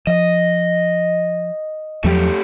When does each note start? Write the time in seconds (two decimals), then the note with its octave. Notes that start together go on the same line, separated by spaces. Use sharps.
0.07 F3 D#5
2.04 E2 F3 F#3 A3 G4